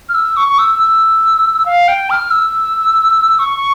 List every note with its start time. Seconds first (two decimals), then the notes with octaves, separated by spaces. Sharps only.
0.09 F6
0.14 E6
0.37 C#6
0.49 C#6
0.58 E6
0.79 E6
1.66 F5
1.88 G5
2.10 F6
2.31 E6
3.39 C#6